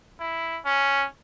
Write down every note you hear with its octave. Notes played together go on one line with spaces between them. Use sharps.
E4
C#4